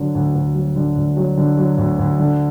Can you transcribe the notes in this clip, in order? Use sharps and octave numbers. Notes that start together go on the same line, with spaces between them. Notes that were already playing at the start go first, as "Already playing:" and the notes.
Already playing: D3 F#3
D2
D2
F#3
D3
D2
F#3
D3
F#3
D2
D2
D3